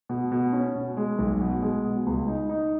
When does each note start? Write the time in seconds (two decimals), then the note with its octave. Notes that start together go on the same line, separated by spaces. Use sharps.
0.09 B2
0.32 B2
0.53 C#4
0.76 B2
0.97 G#3
1.19 B1
1.41 B2
1.62 G#3
1.84 B2
2.06 C#2
2.28 D#4
2.49 D#4